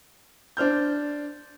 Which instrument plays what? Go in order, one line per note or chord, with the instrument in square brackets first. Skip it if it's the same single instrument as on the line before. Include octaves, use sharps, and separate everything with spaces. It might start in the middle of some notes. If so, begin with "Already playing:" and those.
[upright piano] D4 C5 F6 G6